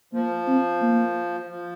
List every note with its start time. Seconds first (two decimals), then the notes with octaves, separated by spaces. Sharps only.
0.13 F3 A#3
0.47 C4
0.82 A#3
1.49 F3